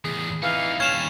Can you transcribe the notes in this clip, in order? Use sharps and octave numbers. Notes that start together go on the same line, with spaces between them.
E2 A2 G#4
F2 E3 D#4 F5
D#2 G3 C#4 G#6 E7 F7